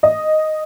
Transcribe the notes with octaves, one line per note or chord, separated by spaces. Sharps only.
D#5